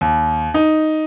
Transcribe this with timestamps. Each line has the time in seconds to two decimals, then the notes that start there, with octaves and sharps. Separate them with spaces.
0.01 D#2
0.54 D#4